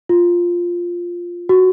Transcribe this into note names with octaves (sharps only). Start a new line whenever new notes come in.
F4
F#4